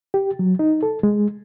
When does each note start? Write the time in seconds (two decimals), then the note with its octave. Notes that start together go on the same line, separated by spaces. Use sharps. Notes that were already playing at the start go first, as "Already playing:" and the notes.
0.14 G4
0.39 F#3
0.59 D#4
0.83 A4
1.03 G#3